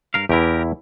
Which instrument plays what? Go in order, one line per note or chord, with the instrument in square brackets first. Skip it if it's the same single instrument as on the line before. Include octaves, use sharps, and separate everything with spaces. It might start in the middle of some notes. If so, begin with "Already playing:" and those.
[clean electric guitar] G2 A#4 F5
[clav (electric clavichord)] E2 E4 [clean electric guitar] G4 A#4